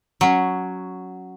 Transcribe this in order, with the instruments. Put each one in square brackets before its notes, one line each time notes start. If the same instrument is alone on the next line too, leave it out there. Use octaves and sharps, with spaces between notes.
[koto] F#3 C#4